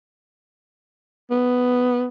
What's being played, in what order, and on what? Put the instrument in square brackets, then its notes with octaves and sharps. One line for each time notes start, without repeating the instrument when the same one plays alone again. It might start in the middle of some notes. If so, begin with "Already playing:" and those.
[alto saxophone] B3